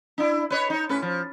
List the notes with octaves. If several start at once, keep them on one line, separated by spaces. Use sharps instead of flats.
D4 E4
B4 C#5 D#5
D#4 C#5
A2 C#4 B4
F3